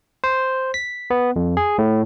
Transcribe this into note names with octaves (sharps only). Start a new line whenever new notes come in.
C5
B6
B3
F2
G#4
A2